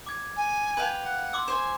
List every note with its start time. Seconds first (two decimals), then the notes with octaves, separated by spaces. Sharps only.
0.06 D6 G#6
0.37 G#5
0.77 B4 F5 G5
1.02 F#5
1.33 C6 D6 E6
1.48 C5 C#5 G#5